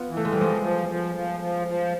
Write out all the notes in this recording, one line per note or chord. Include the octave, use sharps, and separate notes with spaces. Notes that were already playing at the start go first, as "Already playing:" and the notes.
Already playing: B3 F4
E3
A3
G#3
F3 G3
G#3
F3
F3
F3
F3
F3